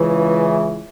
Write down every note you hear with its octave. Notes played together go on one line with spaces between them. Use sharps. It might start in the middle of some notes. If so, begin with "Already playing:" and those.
Already playing: C#2 C#3 E3